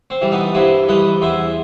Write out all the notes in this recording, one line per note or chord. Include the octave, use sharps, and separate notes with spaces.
C4
E3 G3
B3 D#4
G2 C4 E4
E3 G3 B4 D#5
E2 C5 E5